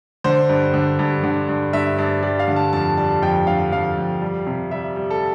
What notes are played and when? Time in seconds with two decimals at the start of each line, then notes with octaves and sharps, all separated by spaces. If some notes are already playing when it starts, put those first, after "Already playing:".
0.24 D3 C5
0.49 G2
0.74 D3
0.99 G2
1.24 D3
1.49 G2
1.73 G2 E5
1.98 G2 D5
2.23 G3 D5
2.40 F5
2.48 D3
2.56 A5
2.73 F2 A5
2.97 G3 A5
3.22 F2 G5
3.47 D3 F5
3.72 F2 F5
3.97 F2
4.21 G3
4.47 C3
4.71 G3 E5
4.96 G3
5.11 A4